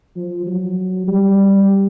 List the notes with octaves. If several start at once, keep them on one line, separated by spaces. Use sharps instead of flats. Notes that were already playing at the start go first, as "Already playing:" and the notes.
F3
F#3
G3